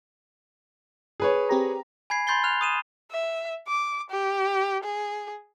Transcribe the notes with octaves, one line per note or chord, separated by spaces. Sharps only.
G#4 B4 C#5
C4 G4 A#5
G#5 B5 G#6 C7
B5 C6 G6 A6 C7 G7
F6 F#6 F7
D#6 D#7 E7
E5
D6
G4
G#4